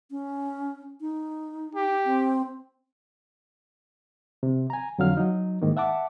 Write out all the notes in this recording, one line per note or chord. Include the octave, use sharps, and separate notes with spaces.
C#4
D#4
G4
C4
C3
G#5 A#5
F2 D3 F#3 F5 F6
F#3 D#4
G#2 D#3 A#3
E5 F#5 A5 D6